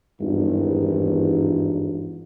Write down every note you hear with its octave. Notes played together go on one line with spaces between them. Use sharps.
G#1 E2 G2